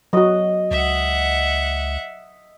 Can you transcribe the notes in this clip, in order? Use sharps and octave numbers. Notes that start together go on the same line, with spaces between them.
F#3 F#4 D#5
C#2 E5 F#5